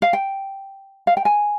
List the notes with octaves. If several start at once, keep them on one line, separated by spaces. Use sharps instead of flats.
F5
G5
F5
G5
G#5